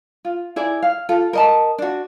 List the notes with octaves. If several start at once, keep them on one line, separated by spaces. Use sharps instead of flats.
F4
E4 G#4 D5
F5
F4 A4
A#4 D#5 A5
D4 F#4